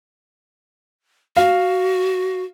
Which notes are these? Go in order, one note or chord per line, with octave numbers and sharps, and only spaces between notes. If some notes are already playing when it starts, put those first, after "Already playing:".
F#4 F5